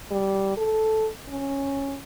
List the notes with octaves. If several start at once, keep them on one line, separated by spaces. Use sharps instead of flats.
G3
A4
C#4